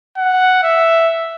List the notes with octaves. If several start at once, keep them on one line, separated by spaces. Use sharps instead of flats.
F#5
E5